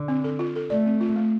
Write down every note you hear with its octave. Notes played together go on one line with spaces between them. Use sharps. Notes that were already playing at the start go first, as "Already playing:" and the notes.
Already playing: D3
C4
A4
F4
A4
A3 D5
C4
F4
A3